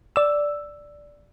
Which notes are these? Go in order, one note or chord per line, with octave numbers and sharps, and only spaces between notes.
D5 E6